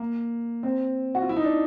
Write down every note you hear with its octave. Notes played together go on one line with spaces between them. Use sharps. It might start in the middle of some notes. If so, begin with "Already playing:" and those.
Already playing: A#3
C4
F#4
F4
E4
D#4
D4